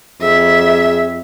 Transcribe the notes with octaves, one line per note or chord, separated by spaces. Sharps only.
F2 G#4 E5